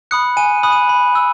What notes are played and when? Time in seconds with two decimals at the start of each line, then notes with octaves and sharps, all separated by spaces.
0.11 B5 D#6 F#6 C#7
0.37 G#5 D#7
0.63 B5 D#6 F#6
0.72 D#7
0.89 B5
1.15 E6